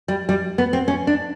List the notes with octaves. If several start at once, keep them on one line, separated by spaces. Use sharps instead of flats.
G3
G3
B3
C4
C#4
D4